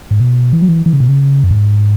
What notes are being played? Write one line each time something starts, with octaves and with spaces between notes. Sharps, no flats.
G#2
B2
E3
F#3
E3
E3
C#3
B2
C#3
F#2
G#2